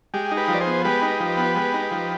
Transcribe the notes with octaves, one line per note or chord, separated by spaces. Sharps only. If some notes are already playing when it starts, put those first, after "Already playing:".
G#3 G4
D#4
G4 B4
F3
D5
G#4 C5
B3
G#3 G4 B4
D#4
F3
B3
G#3
D#4
F3